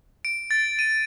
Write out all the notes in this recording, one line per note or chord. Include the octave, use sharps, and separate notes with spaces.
D7
A6
D#7